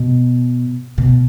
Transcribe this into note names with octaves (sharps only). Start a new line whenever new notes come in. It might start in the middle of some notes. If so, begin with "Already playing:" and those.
Already playing: B2
B2